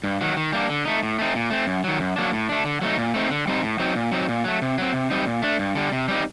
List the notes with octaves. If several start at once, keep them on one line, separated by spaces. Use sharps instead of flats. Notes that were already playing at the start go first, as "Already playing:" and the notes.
G2
D#3 F#3
D#3
G3 A#3 D4
D3
A3 D#4
A2
A3 C4 D#4
A#2
A3 C4
F#2
D#3 F#3
F#2
F#3 A#3 D4
A2
A3 D4
D3
F#3 A3 D#4
A#2
A3 C4 D#4
D3
G3 C4 D#4
A2
F#3 C4 D#4
A#2
F#3 C4 D#4
A#2
F#3 A3
C3
F#3 C4
C3
G3 C4 D#4
A#2
A3 D4
G2
D3 G3
C3
G3 C4 D#4